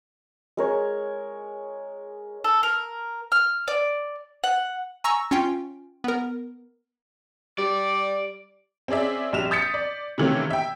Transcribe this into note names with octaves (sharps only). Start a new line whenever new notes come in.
G#3 A#4 C#5
A4
A#4
F6
D5
F#5
G#5 A#5 C#6 E6 A#6
C#4 F4 G5
B3 A#4
G3 D5
C4 C#4 G#4 D5 E5
A#1 G3 E7 F7
D#6 G6 A6 B6 C#7
D5
C3 D#3 E3 A3 A#3 C#4
E5 G5